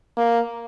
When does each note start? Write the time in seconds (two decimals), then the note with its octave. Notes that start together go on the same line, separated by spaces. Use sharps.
0.17 A#3